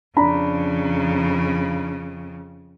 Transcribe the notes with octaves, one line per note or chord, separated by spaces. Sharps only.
F2 C#3 D4 A#5 B5